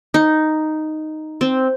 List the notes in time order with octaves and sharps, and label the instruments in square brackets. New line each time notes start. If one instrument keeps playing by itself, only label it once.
[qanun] D#4
C4